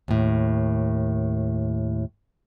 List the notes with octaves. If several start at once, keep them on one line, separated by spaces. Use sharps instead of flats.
D#2 A2